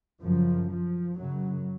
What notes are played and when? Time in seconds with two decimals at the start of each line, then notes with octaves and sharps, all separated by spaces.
0.23 F#2 C#3 F3
0.71 F3
1.18 F#2 C#3 F#3